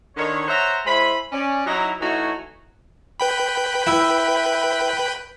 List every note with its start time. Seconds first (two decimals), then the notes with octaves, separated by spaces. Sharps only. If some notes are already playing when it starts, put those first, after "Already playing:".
0.16 D3 D#3 C#5
0.48 C5 C#5 E5 F#5 A#5
0.86 G#3 E4 C5 B5
1.32 C#4 D5
1.67 F#3 D#4 E4
2.00 E3 A3 D#4 F#4 C#5
3.20 B4 G5 B5
3.87 E4